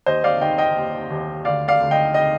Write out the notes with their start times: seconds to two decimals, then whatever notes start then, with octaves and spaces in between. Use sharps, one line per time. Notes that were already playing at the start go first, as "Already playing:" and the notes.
0.06 D#2 C5 D#5
0.24 D5 F5
0.41 D#3 D#5 G5
0.58 D#5 G5
0.77 D#2
1.10 D#2
1.45 D2 D5 F5
1.68 D5 F5
1.80 D2
1.91 D#5 G5
2.14 D#5 G5